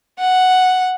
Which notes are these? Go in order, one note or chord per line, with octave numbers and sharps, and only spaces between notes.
F#5